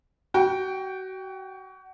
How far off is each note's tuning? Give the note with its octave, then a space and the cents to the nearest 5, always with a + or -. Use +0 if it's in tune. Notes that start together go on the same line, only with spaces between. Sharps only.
F#4 +30 G5 +0